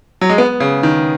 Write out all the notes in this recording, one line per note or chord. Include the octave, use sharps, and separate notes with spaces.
F#3
G#3
B3
C#3
D#3